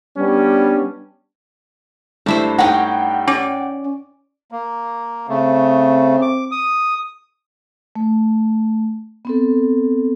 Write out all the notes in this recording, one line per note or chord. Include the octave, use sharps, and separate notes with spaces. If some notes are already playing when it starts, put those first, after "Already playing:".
G3 B3 C#4 D4
G2 A3 D4 E4 C5
C#4 D#4 F#5 G5
C#4 D5
A#3
C#3 A3 C4
D6
D#6
A3
B3 C4 A4